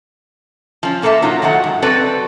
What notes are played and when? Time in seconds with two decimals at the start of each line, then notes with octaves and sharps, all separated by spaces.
0.83 F3 C#4
1.02 A#2 A#3 A4 B4 E5 A5
1.22 F#3 D#4 F4
1.42 D#3 F#3 A3 F#5
1.64 G#2
1.82 F#3 C4 F#4 A4 B4 D5